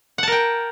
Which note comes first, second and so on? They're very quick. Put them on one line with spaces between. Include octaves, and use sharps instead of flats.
F#5 A5 A#4 G5